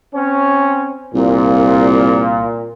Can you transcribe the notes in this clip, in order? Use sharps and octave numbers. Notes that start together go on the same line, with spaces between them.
C4 C#4
C2 A#2